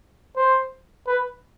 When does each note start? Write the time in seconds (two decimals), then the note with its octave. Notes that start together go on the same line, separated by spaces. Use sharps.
0.37 C5
1.07 B4